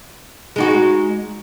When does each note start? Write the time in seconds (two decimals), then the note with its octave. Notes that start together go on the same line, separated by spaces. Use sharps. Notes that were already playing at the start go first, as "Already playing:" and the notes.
0.56 G#3 D#4 F#4